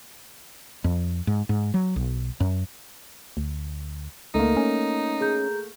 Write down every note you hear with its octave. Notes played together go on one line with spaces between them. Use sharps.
F2
G#2
G#2
F#3
B1
F#2
D2
C#2 A3 A#3 D#4
C#4
G#4 A#5 G6